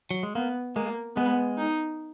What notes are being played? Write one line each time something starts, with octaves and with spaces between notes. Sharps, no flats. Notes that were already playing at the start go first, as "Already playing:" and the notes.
F#3
G#3
A#3 B3
G#3 A#3
G#3 B3
D#4